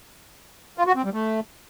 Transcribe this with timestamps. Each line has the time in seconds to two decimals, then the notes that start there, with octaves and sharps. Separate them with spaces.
0.78 F4
0.87 F#4
0.96 C4
1.04 G3
1.13 A3